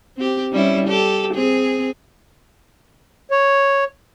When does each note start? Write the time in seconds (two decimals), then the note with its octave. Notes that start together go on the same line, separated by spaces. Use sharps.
0.17 C4 G4
0.52 G3 C#4 E4
0.87 G4 A4
1.34 C4 G#4
3.31 C#5